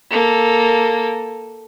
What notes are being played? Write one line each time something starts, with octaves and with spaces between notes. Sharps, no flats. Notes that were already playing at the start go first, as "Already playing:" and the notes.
A#3 A4